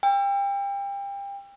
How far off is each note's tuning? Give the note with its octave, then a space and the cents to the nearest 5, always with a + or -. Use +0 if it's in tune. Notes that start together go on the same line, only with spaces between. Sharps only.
G5 +30 E6 +35